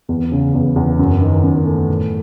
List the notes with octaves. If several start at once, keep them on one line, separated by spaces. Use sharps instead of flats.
E2
C#3
E2
E2
F#2
D#3
F#2
A3
A2